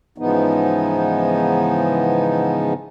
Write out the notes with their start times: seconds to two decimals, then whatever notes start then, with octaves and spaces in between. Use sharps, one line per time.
0.18 G#2 C#3 E3 F3 B3 D#4